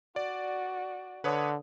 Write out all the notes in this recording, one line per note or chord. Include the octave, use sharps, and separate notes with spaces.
F#4 D5
D3 B4 C#5 D#6